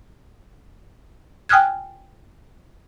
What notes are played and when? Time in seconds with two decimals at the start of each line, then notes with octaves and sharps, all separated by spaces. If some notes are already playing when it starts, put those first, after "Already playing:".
1.49 G5 G#5 D#6 F6 F#6 G#6